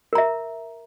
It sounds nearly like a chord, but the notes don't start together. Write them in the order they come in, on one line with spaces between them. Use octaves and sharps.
A#4 A#5 E5